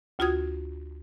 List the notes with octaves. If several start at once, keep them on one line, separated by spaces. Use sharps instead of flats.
D2 F4 F#4 D#6 G#6